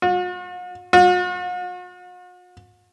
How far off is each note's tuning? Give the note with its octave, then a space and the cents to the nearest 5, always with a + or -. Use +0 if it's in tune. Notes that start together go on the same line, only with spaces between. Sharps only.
F#4 -45
F#4 -45